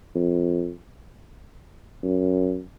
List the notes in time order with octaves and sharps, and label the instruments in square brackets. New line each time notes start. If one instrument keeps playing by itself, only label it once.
[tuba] F2
F#2